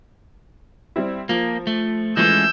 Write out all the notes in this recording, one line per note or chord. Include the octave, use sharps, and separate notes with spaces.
G3 C4 E4
F3 A#3
A3
E3 F3 G#3 A3 C#4 E6 G6